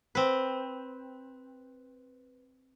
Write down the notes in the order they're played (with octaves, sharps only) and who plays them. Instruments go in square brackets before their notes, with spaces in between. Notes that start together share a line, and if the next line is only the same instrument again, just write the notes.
[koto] C4 B4